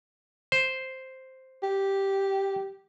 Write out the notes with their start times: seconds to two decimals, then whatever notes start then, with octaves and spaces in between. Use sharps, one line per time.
0.52 C5
1.63 G4